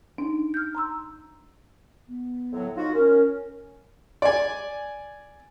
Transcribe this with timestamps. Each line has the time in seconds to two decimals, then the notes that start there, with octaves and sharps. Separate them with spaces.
0.18 D4 D#4
0.54 F6 G6
0.75 A#5 C6 E6
2.08 B3
2.52 A2 D3 F#3
2.75 D#4 F4 F#4
2.94 C#4 A#4
4.22 D5 G#5